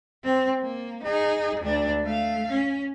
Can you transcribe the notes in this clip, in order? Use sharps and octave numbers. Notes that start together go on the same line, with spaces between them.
C4
A#3
D#4 G#4
D2 D4
A3 F5
C#4